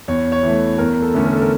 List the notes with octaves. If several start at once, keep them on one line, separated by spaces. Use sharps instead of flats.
E2 C#5
C#5
E3 A3
E2 A#4
A4
D3 A3 C#4
A#4
A4
A#4